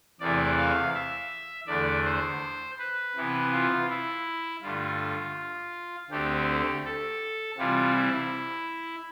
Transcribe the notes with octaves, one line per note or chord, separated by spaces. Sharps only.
E2 C3 E3 A3 D5
F5
E5
E2 D3 A3 D5
C5
B4
C3 E3 B3
F4
E4
G2 D3 A3 F4
D2 D3 A3 C4 G4
A4
C3 E3 G3 C4 F4
E4